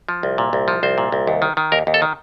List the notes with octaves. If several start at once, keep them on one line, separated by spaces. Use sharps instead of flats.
F3
C2
A#2
C2
F3
C2 C5
A#2
C2
D#2
D#3
D#3
D#2 A#4
D#2
A4
D#3